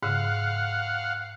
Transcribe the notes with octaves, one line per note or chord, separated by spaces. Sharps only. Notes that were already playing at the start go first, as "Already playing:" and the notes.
G#2 C#3 F5 F#5